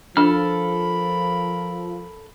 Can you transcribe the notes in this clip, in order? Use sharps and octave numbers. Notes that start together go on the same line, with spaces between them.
F3 D4 A4 A#4 B5 F6